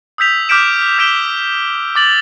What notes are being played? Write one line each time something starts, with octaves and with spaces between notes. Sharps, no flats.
D#6 E6 G6 B6 F7
D6 F6 G6 B6 D7 E7
E6 G6 B6 D7 E7 G7
D6 A6 F#7